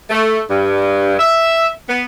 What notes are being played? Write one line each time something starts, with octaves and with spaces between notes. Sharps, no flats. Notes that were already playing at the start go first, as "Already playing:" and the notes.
A3
G2
E5
B3